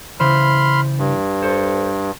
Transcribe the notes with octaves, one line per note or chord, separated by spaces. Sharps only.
C#3 E3 C5 B5 C6 F6
G2
A4 C5